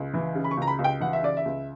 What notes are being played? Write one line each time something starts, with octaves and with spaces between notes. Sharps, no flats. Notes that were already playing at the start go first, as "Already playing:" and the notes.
Already playing: C#2
E3
C#3
B5
C#6
C#2 A#5
B5
C#2
G5
E3 F#5
E5
C#3 D5
E5
C#2